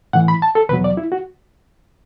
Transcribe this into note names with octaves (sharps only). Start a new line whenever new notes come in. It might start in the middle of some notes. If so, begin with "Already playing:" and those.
A2 E3 F#5
B5
A5
A4
E2 B2 F#3 B4
D5
E4
F#4